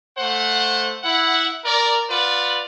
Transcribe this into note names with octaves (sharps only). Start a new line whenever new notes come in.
A3 C5 F#5
E4 F#5
A#4 D5
F4 B4 D5 F#5